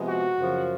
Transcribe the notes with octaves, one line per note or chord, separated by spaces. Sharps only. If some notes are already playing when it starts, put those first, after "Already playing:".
Already playing: C3 F3 G#3 B3
F#4
F#2 C#3 F3